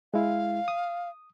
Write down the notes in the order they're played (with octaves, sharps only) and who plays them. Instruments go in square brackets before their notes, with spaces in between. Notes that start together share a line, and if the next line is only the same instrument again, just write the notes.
[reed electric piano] G#3 E4 [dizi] F5
[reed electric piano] D#6